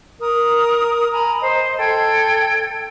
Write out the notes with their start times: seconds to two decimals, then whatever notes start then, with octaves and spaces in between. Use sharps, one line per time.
0.20 A#4 D#6
1.11 G#5 A#5 B5
1.41 C5 D#5
1.78 A4 G5 G#6